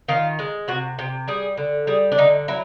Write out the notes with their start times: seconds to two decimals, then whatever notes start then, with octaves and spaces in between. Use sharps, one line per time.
0.08 D#3 F4
0.39 G#3
0.68 C3 F#4
0.99 C3 G4
1.28 G3 G#4
1.57 D3
1.87 G3 G#4
2.12 D4
2.18 D3 D#4
2.48 F#3 E4